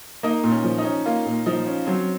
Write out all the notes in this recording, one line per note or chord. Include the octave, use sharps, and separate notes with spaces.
A#3 D#4
A#2
C#4
F3
D#4
C#4
A#3 F4
A#2
F3 D#4
C#4
F#3 C4